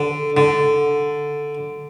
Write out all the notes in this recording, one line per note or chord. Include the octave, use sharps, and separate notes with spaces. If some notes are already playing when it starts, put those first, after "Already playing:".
Already playing: D3
D3